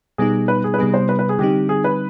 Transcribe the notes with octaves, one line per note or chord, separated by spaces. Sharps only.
B2 G3 B3 D#4 G#4
B4
G#4
B4
C3 G3 B3 D#4 G#4
C5
B4
B4
G#4
D3 G3 C4 D#4 G4
G#4
B4